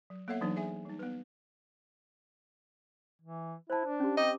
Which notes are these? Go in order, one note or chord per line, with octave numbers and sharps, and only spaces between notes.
F#3
A#3 B3 A4 C#5 E5 F#5
E3 F#3 D4 D#4
G#4 E5 G#5
G3 D#4
B3 B4
E3
E4 C5 A5
D4
C#4 G4
C4 D#5 D6